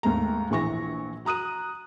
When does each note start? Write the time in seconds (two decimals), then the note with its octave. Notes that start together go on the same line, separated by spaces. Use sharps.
0.03 D#2 G#2 A3 A#5
0.50 A#1 E3 C#6 A#6
1.25 F#4 A#5 D#6 F#6 D#7